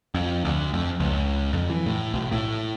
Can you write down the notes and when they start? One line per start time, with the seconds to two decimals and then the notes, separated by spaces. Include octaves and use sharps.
0.14 F2
0.45 D2
0.74 F2
1.00 C#2
1.53 F2
1.70 E3
1.86 A2
2.14 B1
2.31 A2